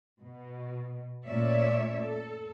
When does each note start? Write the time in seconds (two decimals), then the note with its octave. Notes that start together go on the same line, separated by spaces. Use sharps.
0.22 B2
1.27 A#2 A3 C#4 C#5 D5 E5
2.01 A4